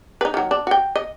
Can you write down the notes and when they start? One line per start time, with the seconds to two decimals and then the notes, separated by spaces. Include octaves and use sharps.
0.21 D#4 B4
0.34 D#3 F#3
0.51 D4
0.67 F#4 G5
0.96 D#5